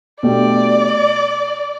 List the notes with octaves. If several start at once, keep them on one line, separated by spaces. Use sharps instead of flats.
B2 A3 D4 G4 D5